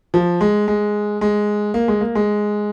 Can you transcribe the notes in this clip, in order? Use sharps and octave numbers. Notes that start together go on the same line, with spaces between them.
F3
G#3
G#3
G#3
A#3
G#3
A#3
G#3